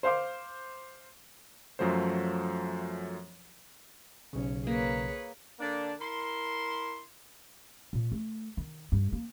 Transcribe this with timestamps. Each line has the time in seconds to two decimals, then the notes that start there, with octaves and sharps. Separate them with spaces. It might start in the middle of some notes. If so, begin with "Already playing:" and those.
0.03 C5 F5 C6 D6
1.79 F#2 F3 F#3 A3 C5
4.33 B1 C#3 C#4
4.67 A#3 G#4 B4 C#5
5.60 D3 A#3 D4
6.00 E4 A#4 C6
7.93 A#2
8.12 A3
8.57 D#3
8.92 G2
9.13 A#3